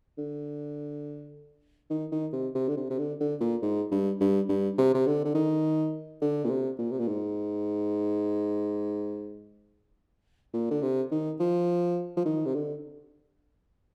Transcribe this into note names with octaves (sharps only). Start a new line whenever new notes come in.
D3
D#3
D#3
C3
C3
D3
C3
C3
D3
D3
A#2
G#2
G2
G2
G2
C3
C3
D3
D3
D#3
D3
A#2
C3
A#2
C3
A#2
G#2
A#2
D3
C3
D#3
F3
F3
D#3
C3
D3